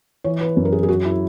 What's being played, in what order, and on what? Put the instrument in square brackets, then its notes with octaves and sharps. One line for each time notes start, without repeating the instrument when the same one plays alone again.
[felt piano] E3 C#5
B4
F#2
A#4
G#4
G#4
F#3 F#4
E4